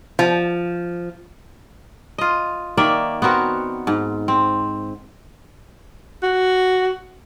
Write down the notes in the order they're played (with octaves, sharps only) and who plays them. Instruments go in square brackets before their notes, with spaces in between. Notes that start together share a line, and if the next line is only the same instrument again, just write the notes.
[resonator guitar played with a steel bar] F3
[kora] F4 D#5
D#3 A#3 D5 E5
B3 C4 F#4 A#4
G#2
C4
[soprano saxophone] F#4